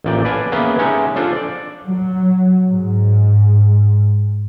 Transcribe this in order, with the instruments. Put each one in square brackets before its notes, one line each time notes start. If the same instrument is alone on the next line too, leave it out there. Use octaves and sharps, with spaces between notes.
[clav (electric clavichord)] A1 A#2 D5 G5
B4 D5 F5 G#5 A5
A#3 B3 C#4 G#4 B4 E5
G#3 C#4 D#4 G4 C#5 E5
D4 F4 A4 C5
D5
[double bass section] F#3
G#2